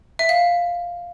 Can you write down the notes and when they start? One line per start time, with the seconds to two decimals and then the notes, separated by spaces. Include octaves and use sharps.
0.19 E5
0.29 F5